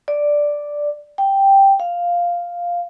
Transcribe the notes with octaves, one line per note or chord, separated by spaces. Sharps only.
D5
G5
F5